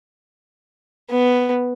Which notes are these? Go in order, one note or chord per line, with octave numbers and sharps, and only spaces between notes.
B3